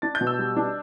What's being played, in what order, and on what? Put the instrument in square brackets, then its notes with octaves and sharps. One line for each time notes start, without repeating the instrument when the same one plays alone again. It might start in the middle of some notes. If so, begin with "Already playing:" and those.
[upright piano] D4 A6
G6
B2
E6
G3
D4